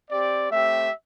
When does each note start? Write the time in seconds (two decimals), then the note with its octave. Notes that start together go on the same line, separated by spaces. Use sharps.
0.11 C4 G4 D5
0.50 A3 C4 G4 E5